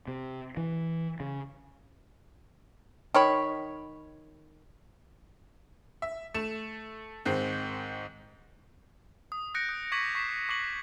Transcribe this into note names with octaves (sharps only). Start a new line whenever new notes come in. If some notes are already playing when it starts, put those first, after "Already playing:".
C3
E3
C#3
D#3 C#5 B5
E5
A3 E7
G#2 D#3 G#3 C4
D#6
D#6 F#6 G6 A#6 C#7 D7
D#6 F#6
C#6 D6 G#6 B6 D#7 F#7
C#6 B6 C7 E7
C#6 D6 F#6 C7 D7 F#7